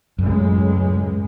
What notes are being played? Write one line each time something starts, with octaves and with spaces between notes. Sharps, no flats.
C#2 F#2 A2 G#3